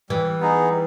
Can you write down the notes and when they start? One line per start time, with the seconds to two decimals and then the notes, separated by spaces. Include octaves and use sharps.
0.10 E3 G3
0.40 B3 D#4 G#4
0.70 G3